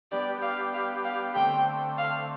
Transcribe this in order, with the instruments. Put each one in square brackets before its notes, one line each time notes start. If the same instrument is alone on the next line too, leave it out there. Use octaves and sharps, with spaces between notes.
[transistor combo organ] G3 B3 D4 G4 [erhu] D5
[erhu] F5
F5
F5
[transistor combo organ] D3 A3 C4 [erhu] G5
[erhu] F5